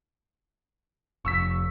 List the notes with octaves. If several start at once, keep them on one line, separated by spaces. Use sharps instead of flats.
F1 C#6 E6 B6